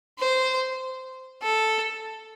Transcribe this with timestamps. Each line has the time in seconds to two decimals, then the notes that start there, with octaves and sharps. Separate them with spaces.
0.19 C5
1.42 A4